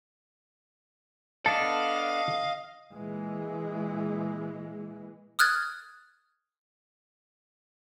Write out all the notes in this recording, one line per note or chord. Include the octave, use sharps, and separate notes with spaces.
B3 D4 A4 D#5 F5 A5
A#2 E3 G#3
D#6 F6 F#6 G#6 A6